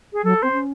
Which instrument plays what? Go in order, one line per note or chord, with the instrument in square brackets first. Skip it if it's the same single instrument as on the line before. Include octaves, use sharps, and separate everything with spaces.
[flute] G#4
[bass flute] F#3 [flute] A4
[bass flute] C4 [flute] C5
[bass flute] C#4